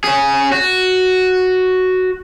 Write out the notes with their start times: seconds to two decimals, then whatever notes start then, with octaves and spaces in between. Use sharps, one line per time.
0.04 C#4 G#4
0.52 F#4